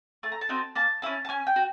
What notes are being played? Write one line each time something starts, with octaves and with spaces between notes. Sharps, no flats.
A3 A5
A#5
A5
C4 D#4 F#4
A#3 A5
C#4 E4 A5
A5
C#4 G#5
G5
F#4